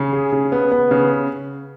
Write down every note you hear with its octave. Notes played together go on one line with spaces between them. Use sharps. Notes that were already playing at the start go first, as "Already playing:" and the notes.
Already playing: C#3
G#4
C#3
B3
B3
C#3